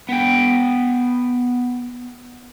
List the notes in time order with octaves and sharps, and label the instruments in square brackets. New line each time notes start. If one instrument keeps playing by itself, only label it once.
[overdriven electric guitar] B3 G5